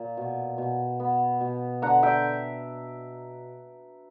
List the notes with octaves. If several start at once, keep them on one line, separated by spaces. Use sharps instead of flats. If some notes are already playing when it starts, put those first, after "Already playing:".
Already playing: A#2
B2
B2
B3
B2
D3 F#5 A#5
E5 G5